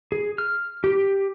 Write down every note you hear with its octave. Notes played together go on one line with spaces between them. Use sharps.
G#4
F6
G4